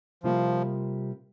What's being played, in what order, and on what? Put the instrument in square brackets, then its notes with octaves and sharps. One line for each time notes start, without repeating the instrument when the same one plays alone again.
[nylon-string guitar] C3 G3 A#3 F4 [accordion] F3